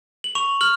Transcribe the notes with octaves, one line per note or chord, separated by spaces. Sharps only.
F#7
C#6 F7
F6 F#7